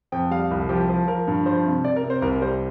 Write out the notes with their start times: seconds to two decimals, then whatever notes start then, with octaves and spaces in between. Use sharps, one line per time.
0.12 F2 G5
0.31 G3 F5
0.51 C2
0.69 F3 G4
0.89 F3
1.07 F3 A#4
1.27 G2
1.46 F3 C5
1.65 C3
1.84 C3 D5
1.96 A#4
2.04 C3
2.10 C5
2.22 C2 A#4
2.41 G3 C5